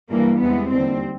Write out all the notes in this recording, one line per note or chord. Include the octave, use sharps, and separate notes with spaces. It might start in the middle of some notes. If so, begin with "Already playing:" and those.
G2 E3 G3 A#3
E2 C3 E3 G#3 B3
D#2 D3 G3 C4